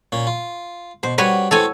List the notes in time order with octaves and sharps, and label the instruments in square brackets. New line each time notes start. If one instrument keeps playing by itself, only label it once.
[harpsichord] A#2 C#4
F4
[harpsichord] B2 [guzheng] C5
[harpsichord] G3 C#4 [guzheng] F#4 B4 C#5
[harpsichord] E3 A3 C4 [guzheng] A4 C#5 G#5